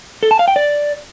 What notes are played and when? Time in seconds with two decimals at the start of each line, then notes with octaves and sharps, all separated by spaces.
0.23 A4
0.31 A5
0.39 F5
0.48 G5
0.56 D5